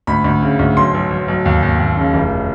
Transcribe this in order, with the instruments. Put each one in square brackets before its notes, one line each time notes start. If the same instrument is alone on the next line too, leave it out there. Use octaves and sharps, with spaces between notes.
[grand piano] D2 B5
D2
C#3
D2
B1 C6
B1
B1
B1
D#2
D#2
D#2
C#3
F1